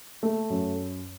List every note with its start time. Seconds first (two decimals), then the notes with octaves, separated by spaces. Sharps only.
0.23 A3
0.50 F#2